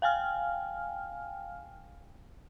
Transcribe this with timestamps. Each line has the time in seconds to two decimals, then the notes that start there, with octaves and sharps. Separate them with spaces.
0.02 F5 G5 G#5 F6